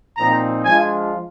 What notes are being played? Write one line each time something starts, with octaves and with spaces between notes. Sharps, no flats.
A#2 F3 C4 D#4 A#5
F3 G#3 D4 F4 G#5